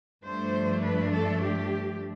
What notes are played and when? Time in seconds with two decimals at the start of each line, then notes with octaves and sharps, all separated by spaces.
0.23 G2 F3 A3 D4 C5
0.83 B4
1.13 A4
1.42 G4